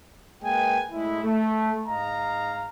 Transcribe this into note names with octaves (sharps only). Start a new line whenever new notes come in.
G#3 A#3 B4 D#5 G5 G#5
A2 G#3 E4
A3
G#2 D#5 F5 A#5